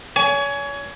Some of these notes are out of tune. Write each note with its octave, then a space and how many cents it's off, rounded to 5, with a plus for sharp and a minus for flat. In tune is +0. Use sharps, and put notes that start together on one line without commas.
C#5 +35 G#5 +15